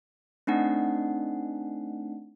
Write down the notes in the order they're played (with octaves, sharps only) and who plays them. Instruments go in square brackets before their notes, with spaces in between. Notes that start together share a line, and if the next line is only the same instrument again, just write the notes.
[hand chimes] A3 C4 D4 D#4 F#5